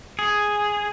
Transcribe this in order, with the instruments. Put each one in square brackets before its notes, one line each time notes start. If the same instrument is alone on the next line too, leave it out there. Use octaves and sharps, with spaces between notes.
[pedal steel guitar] G#4